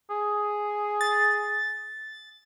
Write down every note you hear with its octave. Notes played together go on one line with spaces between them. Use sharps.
G#4
A6